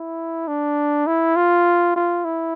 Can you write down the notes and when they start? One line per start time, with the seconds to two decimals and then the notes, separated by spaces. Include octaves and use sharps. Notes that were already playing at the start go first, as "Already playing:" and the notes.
Already playing: E4
0.48 D4
1.07 E4
1.36 F4
1.96 F4
2.25 E4